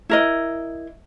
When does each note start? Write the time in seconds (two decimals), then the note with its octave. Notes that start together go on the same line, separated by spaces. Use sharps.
0.09 E4 A#4 D#5